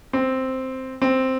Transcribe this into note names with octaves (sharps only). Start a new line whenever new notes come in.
C4
C4